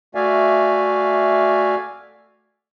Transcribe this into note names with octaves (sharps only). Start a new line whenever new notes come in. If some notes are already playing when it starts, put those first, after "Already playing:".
A3 F#4 D5 E5 F5 G#5